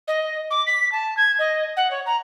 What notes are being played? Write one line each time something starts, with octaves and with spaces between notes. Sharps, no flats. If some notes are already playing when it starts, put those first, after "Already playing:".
D#5
D6
B6
A5
G#6
D#5
F#5
C#5
A#5